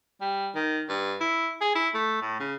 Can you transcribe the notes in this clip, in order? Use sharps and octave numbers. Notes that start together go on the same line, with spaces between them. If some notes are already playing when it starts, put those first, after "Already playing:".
G3
D#3
G2
E4
G#4
E4
A3
A2
C#3